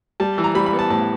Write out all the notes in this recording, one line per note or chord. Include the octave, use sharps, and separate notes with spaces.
G3 A5
E3
A#5
G3 B5
B5
B3
A5
A2 A5